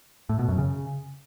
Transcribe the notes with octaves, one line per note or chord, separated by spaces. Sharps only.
A2
B2
F#2
C#3